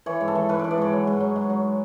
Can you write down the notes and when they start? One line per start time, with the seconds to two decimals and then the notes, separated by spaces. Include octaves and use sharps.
0.06 E3 C#5
0.21 G#2
0.28 A4
0.35 E3
0.49 G#2 B4
0.59 E3 D5
0.71 D5
0.78 G#2 C#5
0.92 F#3
1.07 G#2
1.20 F#3
1.36 G#2
1.50 F#3